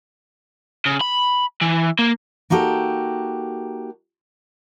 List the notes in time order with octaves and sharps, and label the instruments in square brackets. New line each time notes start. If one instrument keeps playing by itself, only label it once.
[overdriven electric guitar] C#3
B5
E3
A#3
[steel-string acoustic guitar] A#3 D#4 F#4 G4 A4